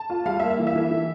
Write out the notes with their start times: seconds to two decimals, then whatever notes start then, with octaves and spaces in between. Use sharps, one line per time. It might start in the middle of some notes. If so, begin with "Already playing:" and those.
Already playing: A5
0.10 F4
0.25 G3 F5
0.40 A#3 E5
0.59 E3
0.67 E5
0.75 E3
0.91 E3